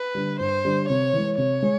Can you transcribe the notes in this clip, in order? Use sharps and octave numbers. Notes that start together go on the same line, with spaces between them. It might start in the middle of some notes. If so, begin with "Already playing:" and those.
Already playing: B4
D3 G3
G2 C5
D3 G3
C3 C#5
E3 G#3
C3 C#5
G#3